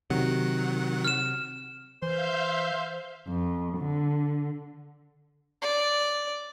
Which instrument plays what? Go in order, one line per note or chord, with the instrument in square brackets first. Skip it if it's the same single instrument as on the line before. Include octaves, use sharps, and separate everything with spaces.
[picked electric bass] C3 [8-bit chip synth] D#3 F#3 F#5
[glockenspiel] F6 E7
[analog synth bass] E3 [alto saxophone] C5 [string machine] E5 F5 G6
[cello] F2
D3
[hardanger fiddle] D5